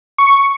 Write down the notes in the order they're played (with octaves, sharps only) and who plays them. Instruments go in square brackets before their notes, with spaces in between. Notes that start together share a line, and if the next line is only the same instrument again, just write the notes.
[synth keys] C#6